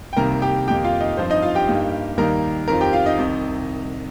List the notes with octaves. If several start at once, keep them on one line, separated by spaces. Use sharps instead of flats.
G5
C2 C3 D#3 G3 A#3 A#4 A#5
G4 G5
F2 D#3 A#3 D#4 G4 G5
F4 F5
D#4 D#5
G2 F3 C4 C5
D#4 D#5
F4 F5
G4 G5
G2 G3 A#3 D#4
D#2 D#3 G3 A#3 D#4 A#4 A#5
F2 D#3 C4 F4 A#4 A#5
G4 G5
F4 F5
D#4 D#5
C2 C3 D#3